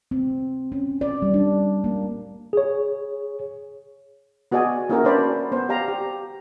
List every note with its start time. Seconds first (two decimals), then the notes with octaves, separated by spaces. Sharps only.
0.11 C4
0.72 C#4
1.01 D5
1.22 G3
1.34 D4
1.84 A#3
2.53 G#4 C#5
4.52 B3 F#4 G#4 D5 D#5 G#5
4.89 A#3 C#4 E4 F#4 G#4 A#4
5.04 C#4 D4 B4 C5 D5 B5
5.52 B3 C5
5.69 G4 D5 F5 A#5
5.88 G4